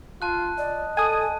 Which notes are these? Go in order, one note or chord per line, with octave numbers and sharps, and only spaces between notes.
F4 A5 F#6
D5 D#5
A4 G#5 A5 D#6